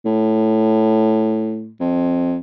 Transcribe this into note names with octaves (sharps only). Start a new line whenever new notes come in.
A2
F2